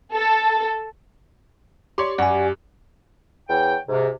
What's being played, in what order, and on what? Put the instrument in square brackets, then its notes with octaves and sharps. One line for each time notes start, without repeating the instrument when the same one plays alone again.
[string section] A4
[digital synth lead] G4 [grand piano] C#5 D5 C6
[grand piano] F#2 [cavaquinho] F#4 [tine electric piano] D5 G#5
[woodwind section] E2 C#5 G5
G#2 C3